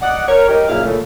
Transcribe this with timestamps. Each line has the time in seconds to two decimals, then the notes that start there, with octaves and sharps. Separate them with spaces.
0.02 D5 D#5 F#5
0.28 A#4 C#5
0.49 D#4 G4 A#4
0.68 F#2 A#2 E4 G#4 F5
0.84 A#2 C#3 A3